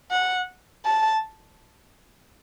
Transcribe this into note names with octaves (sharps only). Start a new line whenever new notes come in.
F#5
A5